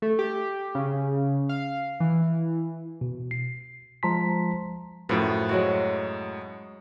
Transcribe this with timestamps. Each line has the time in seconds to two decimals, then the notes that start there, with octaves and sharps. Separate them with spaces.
0.02 A3
0.19 G4
0.75 C#3
1.49 F5
2.00 E3
3.01 B2
3.31 C7
4.03 F3 G#3 A5 A#5 C6 B6
5.09 F#2 A2 F3 F#4 B4
5.49 F#3 G#3 F#4